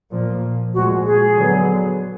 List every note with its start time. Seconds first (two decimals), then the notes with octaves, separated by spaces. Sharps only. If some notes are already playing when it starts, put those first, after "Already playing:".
0.11 A#2 F3 A#3
0.74 A#2 F3 G#3 F#4
1.05 G#4
1.36 D3 F#3 B3